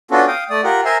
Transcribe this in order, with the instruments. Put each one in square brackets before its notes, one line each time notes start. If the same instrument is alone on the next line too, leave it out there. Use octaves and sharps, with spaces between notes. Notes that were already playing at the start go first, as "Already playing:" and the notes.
[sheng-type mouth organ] B3 C#4 D4 F4 F#4 A4
F5 G5 D#6
A3 D5 D#6
F4 G4 A#4 F#5
A#4 C5 E5 G#5 A#5 C6